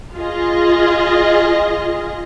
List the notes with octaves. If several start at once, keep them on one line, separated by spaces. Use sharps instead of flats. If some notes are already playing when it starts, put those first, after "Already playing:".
F4 G#4 D#5